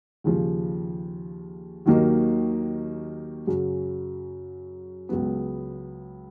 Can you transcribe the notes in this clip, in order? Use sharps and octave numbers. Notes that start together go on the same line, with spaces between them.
D#2 C#3 F3
D#2 D#3 F#3 A#3 D#4
F#2 C#3 F#3
C#2 C#3 F#3 B3